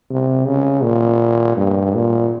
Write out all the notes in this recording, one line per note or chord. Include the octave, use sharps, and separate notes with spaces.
C3
C#3
A#2
G2
A#2